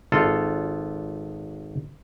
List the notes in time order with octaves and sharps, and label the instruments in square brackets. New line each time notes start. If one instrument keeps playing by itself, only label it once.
[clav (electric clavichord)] G#1 F4 A4